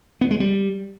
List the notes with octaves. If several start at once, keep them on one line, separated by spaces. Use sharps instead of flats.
B3
G#3
G3